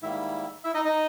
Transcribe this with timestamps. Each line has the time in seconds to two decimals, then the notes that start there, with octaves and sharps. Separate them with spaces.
0.02 G#2 D#3 G3 A#3 E4 E5
0.64 E4 E5
0.74 D#4 D#5
0.85 D#4 D#5